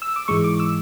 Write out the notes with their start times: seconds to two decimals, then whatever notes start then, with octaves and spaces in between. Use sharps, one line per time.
0.02 E6
0.16 D6
0.28 G#2 E3 G#3 C#6
0.44 D6
0.60 E6